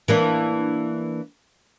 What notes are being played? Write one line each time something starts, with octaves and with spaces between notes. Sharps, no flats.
E3 A#3 D4